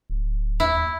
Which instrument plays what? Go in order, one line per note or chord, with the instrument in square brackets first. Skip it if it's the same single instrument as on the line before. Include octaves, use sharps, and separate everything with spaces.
[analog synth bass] D1
[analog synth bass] D#2 [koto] E4